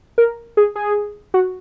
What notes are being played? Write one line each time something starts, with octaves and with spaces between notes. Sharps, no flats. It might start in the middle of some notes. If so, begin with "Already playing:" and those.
A#4
G#4
G#4
F#4